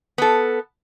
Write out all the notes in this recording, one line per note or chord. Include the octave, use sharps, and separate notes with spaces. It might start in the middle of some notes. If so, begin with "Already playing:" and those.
B3 A4